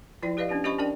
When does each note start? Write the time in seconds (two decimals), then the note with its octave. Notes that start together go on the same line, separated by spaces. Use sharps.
0.23 F3 E4 F4 D5 G5
0.37 G4 B4 D5 D#5 F5
0.49 B3 C#4 D4 G4
0.64 C#4 G4 C5 D#5 B5 C#6
0.78 C#4 D4 A#4 D5 G5